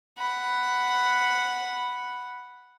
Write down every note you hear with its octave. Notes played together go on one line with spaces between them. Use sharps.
F#5 B5